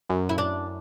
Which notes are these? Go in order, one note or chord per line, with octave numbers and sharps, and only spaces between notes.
F#2
E4
D4